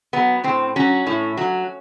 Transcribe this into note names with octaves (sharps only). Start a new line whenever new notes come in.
F#3 B3
A2 C4
F#3 C#4
A2
F#3